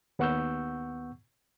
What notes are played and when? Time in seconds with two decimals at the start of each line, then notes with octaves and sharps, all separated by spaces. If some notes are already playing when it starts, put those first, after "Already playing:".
0.19 D#2 B3 F#5 C#6 E6 G6